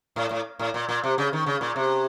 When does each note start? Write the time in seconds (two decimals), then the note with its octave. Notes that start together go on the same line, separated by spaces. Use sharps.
0.16 A2
0.31 A2
0.59 A2
0.74 A#2
0.89 A#2
1.04 C3
1.18 C#3
1.33 D#3
1.46 C#3
1.61 A#2
1.76 C3